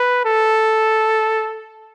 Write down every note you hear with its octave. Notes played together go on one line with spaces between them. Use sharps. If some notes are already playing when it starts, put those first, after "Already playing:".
Already playing: B4
A4